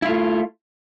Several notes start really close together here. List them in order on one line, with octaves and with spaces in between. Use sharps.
E4 F4 A3